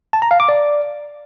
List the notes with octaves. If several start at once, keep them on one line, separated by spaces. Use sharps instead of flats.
A5
A#5
F5
D6
D5